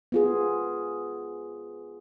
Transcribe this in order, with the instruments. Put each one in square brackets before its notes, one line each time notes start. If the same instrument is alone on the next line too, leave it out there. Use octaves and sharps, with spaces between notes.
[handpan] B3 F4 G#4